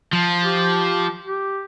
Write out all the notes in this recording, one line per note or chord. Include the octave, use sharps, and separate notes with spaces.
F3
G4
G4